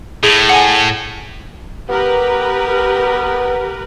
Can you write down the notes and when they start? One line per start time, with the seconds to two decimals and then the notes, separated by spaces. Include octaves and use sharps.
0.23 A2 G#4
0.49 F#5 G#5
1.89 B3 G4 A#4 B4